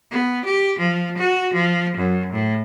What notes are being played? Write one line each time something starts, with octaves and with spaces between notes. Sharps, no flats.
B3
G4
F3
F#4
F3
F#2
A2